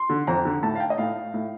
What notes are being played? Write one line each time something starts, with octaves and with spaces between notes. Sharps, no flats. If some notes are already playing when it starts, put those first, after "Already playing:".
Already playing: C6
D3
F2 A#5
D3
A2 A5
F5
G5
D#5
A2 F5
A2